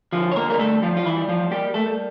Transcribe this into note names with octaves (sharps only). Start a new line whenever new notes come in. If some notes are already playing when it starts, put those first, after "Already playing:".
D3 F3 F4
C#5
A#3 A#4
G3 A#4
A3 A4
F3 G3 F4
F4
E3 E4
G3
F3 F4
G3 A#3 G4
A3 A4
G3